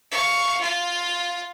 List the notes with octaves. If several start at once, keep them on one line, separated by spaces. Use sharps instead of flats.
F5 C#6
F4 F5